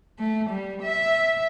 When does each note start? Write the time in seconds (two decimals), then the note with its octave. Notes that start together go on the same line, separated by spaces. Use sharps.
0.19 A3
0.50 G3
0.82 E5